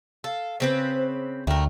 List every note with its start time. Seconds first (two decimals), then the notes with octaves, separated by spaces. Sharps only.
0.24 A4 F5
0.60 C#3 C4 B4 C5
1.47 D2 A3 A#4 G5